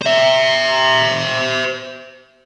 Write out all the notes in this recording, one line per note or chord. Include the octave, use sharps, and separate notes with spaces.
C5 E5